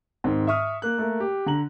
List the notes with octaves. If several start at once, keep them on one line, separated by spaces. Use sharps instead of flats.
G#2 D#3 C4
E5 C#6 D#6 F6
A#3 F#6
A3 A#3 A#4
G4
D3 A#5 F#7